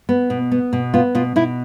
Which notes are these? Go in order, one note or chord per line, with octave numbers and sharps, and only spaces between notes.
B3
B2
B3
B2
B3 F4
B2 F4
B2 E4